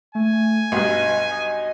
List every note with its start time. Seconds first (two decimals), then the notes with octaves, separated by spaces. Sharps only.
0.15 A3 G#5
0.72 B1 G2 D#5
1.31 D#5